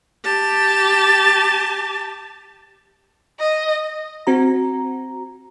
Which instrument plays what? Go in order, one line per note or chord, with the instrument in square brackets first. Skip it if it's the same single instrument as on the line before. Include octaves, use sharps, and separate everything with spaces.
[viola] G4 A5
[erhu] D#5
[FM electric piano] C4 F#4 A#5